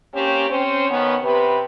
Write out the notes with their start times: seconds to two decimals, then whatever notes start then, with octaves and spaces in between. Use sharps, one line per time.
0.14 A#3 C4 C#4 G4 C#5
0.50 C4 C#4 C5
0.90 D#3 B3 C#4
1.23 C3 B4